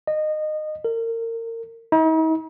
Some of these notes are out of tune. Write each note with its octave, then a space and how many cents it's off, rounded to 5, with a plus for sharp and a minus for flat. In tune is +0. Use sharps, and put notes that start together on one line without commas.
D#5 -20
A#4 -30
D#4 +45